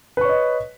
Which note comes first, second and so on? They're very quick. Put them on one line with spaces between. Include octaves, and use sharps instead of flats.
B4 C#6 C#5 D#5